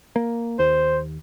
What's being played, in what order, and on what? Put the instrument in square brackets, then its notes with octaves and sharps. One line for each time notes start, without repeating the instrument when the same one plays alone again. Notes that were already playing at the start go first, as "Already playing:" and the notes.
[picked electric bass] A#3
[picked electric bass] D#2 [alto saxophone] C5